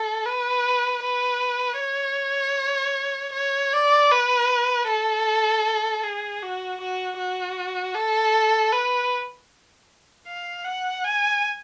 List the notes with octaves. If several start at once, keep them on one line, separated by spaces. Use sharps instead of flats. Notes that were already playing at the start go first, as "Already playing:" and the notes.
Already playing: A4
B4
B4
C#5
C#5
D5
B4
A4
G#4
F#4
F#4
F#4
A4
B4
F5
F#5
G#5